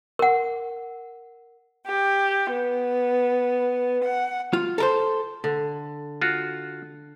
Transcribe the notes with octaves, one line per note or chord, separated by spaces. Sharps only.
A#4 F#5
G4
B3
F#5
F4
A4 A#4 C5
D3
F4 F#4